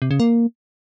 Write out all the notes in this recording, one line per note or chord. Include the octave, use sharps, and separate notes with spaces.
C3
C#3
A#3